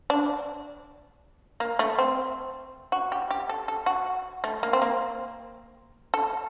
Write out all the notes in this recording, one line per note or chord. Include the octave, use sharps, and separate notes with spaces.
D4
A#3
A3
C4
F#4
G4
G4
A4
A4
F#4
A3
A#3
C4
A#3
A4